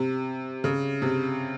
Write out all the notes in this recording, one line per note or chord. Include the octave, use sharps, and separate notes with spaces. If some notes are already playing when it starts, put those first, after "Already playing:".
Already playing: C3
C#3
C3